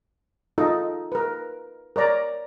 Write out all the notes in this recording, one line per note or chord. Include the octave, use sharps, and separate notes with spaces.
D#4 F4 A4 D#5
A#4 B4
A#4 C#5 D5 A#5